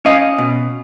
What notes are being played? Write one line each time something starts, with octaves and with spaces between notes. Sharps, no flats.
C#4 D#5 F5
B2